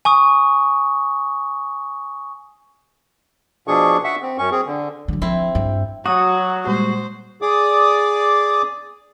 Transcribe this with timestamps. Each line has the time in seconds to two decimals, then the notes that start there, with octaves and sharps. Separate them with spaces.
0.05 G#5 C#6 D#6
3.68 B2 F3 D4 G#4 C#6
4.04 E5 F#5 C#6
4.22 C4
4.38 F#2 C#4 C#6
4.51 C4 G#4
4.66 D3
5.08 D3 F#3
5.22 F3 C4 E4
5.55 G2
6.06 F#3 F#4 D#6
6.67 A#2 G3 G#3 C5
7.42 G#4 D5 D6 D#6